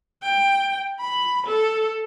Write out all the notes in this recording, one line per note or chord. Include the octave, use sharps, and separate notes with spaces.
G5
B5
A4